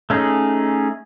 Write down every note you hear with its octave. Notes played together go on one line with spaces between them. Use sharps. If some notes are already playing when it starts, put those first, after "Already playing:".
A3 C#4 D#4 G#4